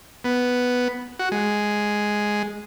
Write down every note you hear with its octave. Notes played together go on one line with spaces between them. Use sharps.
B3
F#4
G#3